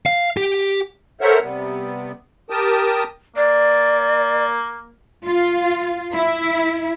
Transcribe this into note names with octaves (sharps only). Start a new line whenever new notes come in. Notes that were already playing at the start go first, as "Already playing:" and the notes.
F5
G4
A4 A#4 C5 C#5 E5 F#5
C3 G3 B3
G4 A#4 G5 A5 D#6
A#3 D5
F4
E4